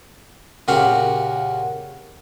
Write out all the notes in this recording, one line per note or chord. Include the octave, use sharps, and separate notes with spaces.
A#2 C#3 F#4 G4 F5 F#5